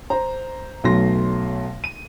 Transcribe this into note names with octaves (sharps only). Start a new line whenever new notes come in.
C5 A#5
B1 B2 F#3 A3 C6 A#6
D#7